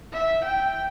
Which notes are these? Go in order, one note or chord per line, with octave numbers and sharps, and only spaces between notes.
E5
G5